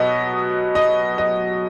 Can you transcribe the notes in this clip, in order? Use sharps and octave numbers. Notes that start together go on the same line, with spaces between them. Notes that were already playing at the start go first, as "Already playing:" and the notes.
Already playing: B2 F#3 B3 D#5
D#5
D#5